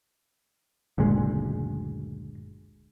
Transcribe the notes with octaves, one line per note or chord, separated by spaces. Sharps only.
F#1 D2 A#2 G#3